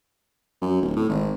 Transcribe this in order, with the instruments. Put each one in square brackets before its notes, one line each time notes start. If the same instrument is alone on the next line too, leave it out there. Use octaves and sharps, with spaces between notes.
[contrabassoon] F#2
D1
A2
G#1